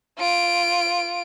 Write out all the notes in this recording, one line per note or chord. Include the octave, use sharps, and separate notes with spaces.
F4 D7